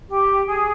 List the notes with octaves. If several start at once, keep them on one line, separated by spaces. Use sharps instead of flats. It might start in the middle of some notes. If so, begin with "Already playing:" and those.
G4
G#4